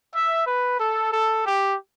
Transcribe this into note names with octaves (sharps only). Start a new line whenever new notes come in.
E5
B4
A4
A4
G4